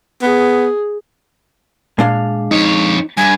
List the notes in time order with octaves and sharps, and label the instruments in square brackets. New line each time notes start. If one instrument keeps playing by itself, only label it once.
[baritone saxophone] B3 [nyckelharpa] G#4
[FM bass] A#2 [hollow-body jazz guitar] G#3 D4 F5
[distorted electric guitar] F2 C#5 [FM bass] D#4
[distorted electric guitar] G2 [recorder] G#5